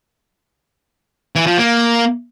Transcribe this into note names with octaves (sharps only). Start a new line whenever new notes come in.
E3
F3
A#3